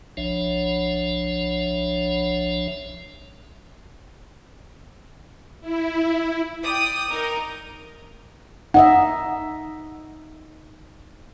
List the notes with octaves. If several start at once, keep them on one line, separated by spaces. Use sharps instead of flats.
B1 F3 D4 C#5 E5
E4
D5 G5 D#6
D#4 A#4 D#5
D#4 D#5 E5 F#5